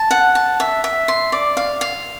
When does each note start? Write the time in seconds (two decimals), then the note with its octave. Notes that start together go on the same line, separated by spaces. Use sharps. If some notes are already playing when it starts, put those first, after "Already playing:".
Already playing: A5
0.11 F#5
0.35 A5
0.60 E5
0.84 E5
1.08 C6
1.32 D5
1.57 F5
1.81 F5